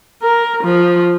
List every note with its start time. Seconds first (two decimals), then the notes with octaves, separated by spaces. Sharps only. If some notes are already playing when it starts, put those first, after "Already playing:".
0.21 A#4
0.61 F3